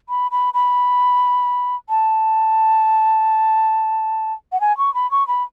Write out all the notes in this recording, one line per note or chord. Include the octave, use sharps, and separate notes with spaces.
B5
B5
B5
A5
F#5
G#5
C#6
B5
C#6
B5